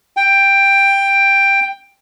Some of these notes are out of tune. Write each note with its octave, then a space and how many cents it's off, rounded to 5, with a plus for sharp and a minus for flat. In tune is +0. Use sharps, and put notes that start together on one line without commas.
G5 +10